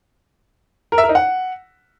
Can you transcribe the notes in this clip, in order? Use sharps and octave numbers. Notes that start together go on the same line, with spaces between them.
A#4
E5
A#4
D#4
F#5